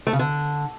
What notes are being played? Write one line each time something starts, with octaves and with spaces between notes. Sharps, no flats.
A3
C#3
D3